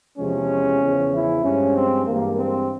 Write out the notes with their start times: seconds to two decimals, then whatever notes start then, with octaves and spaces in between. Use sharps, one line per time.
0.18 E2 C3 F3 G#3 C#4
0.81 E2 C#3 F3
1.12 E4
1.43 G2 F3 G#3 C#4
1.76 C4
2.07 G2 E3 G#3 A#3
2.38 C4